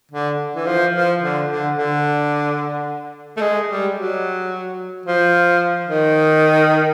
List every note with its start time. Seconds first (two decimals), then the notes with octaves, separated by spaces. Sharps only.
0.12 D3
0.56 E3
0.66 F3
0.94 F3
1.21 D3
1.49 D3
1.77 D3
3.37 A3
3.41 G#3
3.68 G3
3.95 F#3
5.06 F3
5.87 D#3